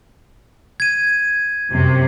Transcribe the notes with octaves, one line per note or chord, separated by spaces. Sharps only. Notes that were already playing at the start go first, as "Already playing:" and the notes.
G#6 D#7
F#2 C3